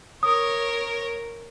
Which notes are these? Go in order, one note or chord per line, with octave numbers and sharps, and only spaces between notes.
A#4 C#5 D#6